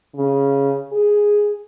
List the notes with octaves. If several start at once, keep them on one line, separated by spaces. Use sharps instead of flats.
C#3
G#4